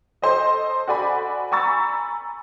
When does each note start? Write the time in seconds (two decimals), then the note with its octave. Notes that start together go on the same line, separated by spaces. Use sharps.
0.22 A4 C5 D#5
0.87 F#4 A4 D5 G#5 B5
1.52 G#5 A#5 B5 C#6 E6 A6